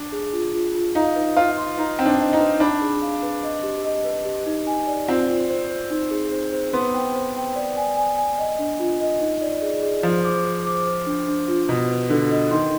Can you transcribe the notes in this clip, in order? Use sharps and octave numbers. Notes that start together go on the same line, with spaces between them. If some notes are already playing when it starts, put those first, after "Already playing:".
Already playing: D4
G#4
F4
F4
F4
D#4 F5
B4
F4 B4
C6
D#4 B4
C4 G5
D4
D#5
D#4
B4
D4 B5
G#4
F5
B4
D#5
G4
D#5
B4
G4
D#4
G#5
D5
C4 F4
F4
C5
C5
D#4
G#4
C5
C5
B3 C6
G5
C5
G5
D5
G#5
G#5
G#5
D#5
D4
F4
D#5
D#4
D5
G#4
G#4
F3 C5
D6
C5
D6
C5
D4
D4
F4
B2 B4
B4
D3 B4
D#5
D#3 C6